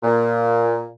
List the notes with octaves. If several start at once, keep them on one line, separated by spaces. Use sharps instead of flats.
A#2